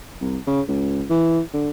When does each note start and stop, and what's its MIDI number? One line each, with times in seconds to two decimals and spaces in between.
0.21 0.37 36
0.47 0.61 49
0.69 1.04 37
1.10 1.41 52
1.54 1.71 50